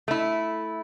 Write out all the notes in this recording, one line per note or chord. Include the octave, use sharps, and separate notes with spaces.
A3 E4